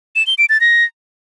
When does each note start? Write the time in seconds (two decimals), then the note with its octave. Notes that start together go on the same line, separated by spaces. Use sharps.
0.16 E7
0.27 G7
0.38 D7
0.49 A6
0.61 A#6